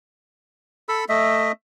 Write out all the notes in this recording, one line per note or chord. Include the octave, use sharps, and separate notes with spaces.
A4 B5 E6
A3 D#5 E5